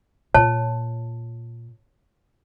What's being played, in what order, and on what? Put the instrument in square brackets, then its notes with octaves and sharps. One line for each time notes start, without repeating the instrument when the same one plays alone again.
[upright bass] A#2 F4 [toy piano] C#5 A5